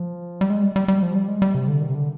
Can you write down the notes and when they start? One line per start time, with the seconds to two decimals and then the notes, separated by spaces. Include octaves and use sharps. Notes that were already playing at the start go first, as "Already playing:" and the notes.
Already playing: F3
0.41 G3
0.50 G#3
0.63 G3
0.76 G3
0.88 G3
1.03 F3
1.15 G3
1.28 G#3
1.42 G3
1.55 C3
1.68 D3
1.81 D#3
1.89 C3
1.95 D3